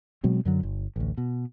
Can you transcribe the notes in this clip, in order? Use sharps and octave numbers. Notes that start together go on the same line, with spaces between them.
B2 F#3 G#3 C4
F#2 D3 F#3
G1
A1 D2
B2